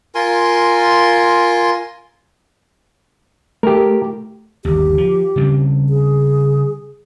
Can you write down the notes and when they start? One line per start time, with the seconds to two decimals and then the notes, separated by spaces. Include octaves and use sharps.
0.15 F4 A#4 G#5 C6
3.63 A3 G4 A#4
4.65 G1 D#2 G4
4.98 F3
5.36 C#3 G3 C4
5.89 G#4